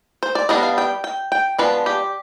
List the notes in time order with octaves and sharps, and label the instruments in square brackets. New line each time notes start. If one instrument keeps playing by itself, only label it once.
[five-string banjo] C5
D5
G3 B3 D4 D#5
F5
G5
G5
G5
F3 G#3 B3 D4 B4
G4